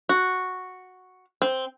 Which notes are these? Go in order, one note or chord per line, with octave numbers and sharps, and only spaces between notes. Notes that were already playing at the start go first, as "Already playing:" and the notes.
F#4
C4